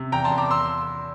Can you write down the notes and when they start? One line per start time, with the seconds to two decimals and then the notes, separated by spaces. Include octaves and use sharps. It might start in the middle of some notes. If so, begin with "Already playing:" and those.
Already playing: C3
0.12 E2 G5 A#5
0.24 A5 C6
0.31 E2
0.38 A#5 D6
0.51 C6 E6